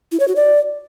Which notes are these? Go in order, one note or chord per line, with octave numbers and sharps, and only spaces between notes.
E4
C#5
F#4
D5